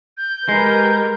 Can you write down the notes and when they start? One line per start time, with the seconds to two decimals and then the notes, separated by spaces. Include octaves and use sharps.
0.17 G6
0.49 G#3 G4 A#4 B4